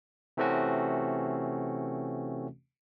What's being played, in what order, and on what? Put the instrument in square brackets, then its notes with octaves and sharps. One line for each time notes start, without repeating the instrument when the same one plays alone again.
[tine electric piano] C3 E3 A3 C4 C#4 F#4